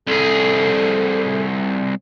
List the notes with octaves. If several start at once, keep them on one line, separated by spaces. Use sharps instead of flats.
C2 G#4 A4